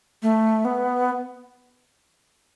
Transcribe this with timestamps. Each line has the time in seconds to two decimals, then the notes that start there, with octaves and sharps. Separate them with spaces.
0.23 A3
0.65 B3